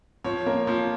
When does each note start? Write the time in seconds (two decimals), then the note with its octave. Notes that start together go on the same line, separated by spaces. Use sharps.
0.24 F3 C#5
0.46 A#3
0.67 F3